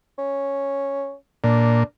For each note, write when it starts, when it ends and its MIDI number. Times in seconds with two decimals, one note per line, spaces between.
0.18 1.14 61
1.44 1.83 46
1.44 1.82 62